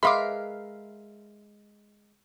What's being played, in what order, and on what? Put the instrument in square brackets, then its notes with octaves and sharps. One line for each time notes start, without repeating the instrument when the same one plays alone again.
[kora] G#3 A#4 B4 [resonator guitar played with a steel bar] E5 F5 [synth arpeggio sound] B5 C6 D6